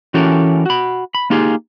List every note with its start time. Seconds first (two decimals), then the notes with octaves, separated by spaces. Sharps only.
0.14 E3 C#4 F#4 G4 A4 A#4
0.66 F#4 B5
1.15 B5
1.30 A#3 D#4 F4 G4 G#4